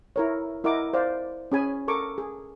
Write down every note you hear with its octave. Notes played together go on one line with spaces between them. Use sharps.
E4 A#4 C#5
E4 A#4 D#5 F#5 D6
C5 D5 F5
C#4 G#4 G#5 B5
A4 A#4 C#6 D6
G#4